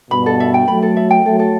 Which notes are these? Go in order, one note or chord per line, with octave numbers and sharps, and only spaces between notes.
G2 B2 B5
A4
E5
G5
F#3 A3 B5
A4
E5
G5
F#3 A3 A4
A4